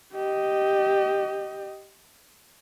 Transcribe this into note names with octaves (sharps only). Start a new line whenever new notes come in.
G4 D#5